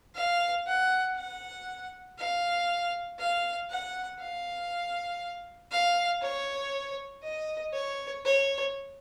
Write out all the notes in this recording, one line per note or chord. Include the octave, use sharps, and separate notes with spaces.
F5
F#5
F#5
F5
F5
F#5
F5
F5
C#5
D#5
C#5
C#5